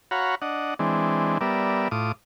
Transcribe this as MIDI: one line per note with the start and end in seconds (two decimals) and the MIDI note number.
0.11 0.35 66
0.11 0.35 73
0.11 0.35 77
0.11 0.35 78
0.11 0.35 82
0.11 0.35 83
0.42 0.74 62
0.42 0.74 75
0.42 0.74 78
0.79 1.38 52
0.79 1.38 56
0.79 1.38 60
0.79 1.38 62
1.41 1.88 55
1.41 1.88 59
1.41 1.88 70
1.41 1.88 74
1.41 1.88 76
1.91 2.12 45
1.91 2.12 65
1.91 2.12 86
1.91 2.12 87